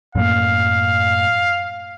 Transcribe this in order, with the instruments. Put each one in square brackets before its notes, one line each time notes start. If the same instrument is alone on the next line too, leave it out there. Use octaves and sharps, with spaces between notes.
[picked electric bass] F#2 A2 A#3 [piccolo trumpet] F5